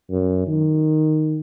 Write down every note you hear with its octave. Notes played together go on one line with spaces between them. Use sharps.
F#2
D#3